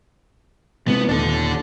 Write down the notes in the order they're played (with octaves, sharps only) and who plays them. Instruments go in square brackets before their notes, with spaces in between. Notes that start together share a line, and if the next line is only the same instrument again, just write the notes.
[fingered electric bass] C3 G#3 C4 [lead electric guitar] B3
[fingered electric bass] D#1 [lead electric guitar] D4 A4